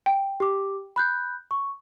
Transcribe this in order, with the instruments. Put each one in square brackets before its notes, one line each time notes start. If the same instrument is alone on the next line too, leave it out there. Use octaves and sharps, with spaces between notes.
[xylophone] G5
[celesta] G4 D6
B5 F#6 G6
C#6